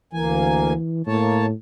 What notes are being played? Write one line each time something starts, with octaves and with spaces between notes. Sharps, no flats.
D2 E3 A#3 G#5
A2 A#3 C#5 A5